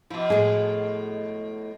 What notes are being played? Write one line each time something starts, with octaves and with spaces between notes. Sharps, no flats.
B2 F3 E4
A2 G#3 G#4